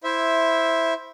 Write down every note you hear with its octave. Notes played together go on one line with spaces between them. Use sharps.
E4 C5 E5